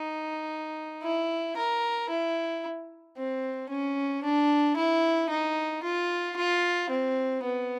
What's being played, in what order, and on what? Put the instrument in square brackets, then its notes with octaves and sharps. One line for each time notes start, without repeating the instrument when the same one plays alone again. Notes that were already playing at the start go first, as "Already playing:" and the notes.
Already playing: [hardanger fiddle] D#4
E4
A#4
E4
C4
C#4
D4
E4
D#4
F4
F4
C4
B3